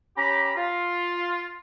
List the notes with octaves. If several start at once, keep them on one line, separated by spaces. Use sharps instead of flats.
C#4 G4 A#5 B5
F4